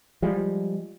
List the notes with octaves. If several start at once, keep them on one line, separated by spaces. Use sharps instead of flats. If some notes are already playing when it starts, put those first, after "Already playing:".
F3 G3 G#3